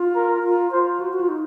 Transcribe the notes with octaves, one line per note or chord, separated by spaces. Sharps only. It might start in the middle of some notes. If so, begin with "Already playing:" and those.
Already playing: F4
A#4
F4
F4 C5
F#4
F#4
F4
D#4